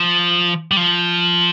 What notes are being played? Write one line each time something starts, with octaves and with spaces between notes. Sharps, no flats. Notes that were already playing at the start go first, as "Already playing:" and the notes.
Already playing: F3
G3
F3